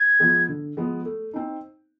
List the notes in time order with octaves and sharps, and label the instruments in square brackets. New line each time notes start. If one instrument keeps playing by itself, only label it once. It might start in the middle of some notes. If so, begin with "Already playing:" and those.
Already playing: [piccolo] G#6
[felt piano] F3 G#3 B3
D3
F3 G#3 B3
A3
C4 D#4